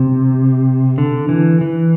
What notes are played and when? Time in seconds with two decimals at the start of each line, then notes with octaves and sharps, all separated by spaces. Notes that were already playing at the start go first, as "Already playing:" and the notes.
Already playing: C3
0.98 D3
1.29 E3
1.61 E3